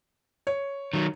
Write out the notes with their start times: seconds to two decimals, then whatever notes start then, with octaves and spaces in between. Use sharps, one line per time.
0.47 C#5
0.93 D#3 F#3